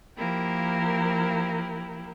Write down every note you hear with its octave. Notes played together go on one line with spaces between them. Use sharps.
F3 A#3 E4 G4 A#4